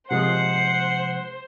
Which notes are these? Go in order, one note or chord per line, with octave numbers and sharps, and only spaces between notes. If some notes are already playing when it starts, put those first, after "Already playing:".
C3 F3 G#3 C5 F#5 C7